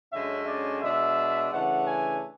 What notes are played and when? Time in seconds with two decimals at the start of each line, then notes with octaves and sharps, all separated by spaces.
0.12 F#2 D3 G#3 C#4 E5
0.47 D5
0.81 B2 G#3 D4 E5
1.51 C#3 E3 A3 D4 F#5
1.87 G#5